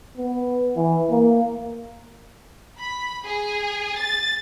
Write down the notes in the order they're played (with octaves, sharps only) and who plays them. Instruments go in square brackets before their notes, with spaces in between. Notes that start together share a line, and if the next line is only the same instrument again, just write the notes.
[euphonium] B3
E3
A#3
[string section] B5
G#4
A6